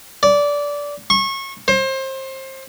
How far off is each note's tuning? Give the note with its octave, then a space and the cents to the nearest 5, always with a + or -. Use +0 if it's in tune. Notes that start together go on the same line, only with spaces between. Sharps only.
D5 -20
C#6 -25
C5 +30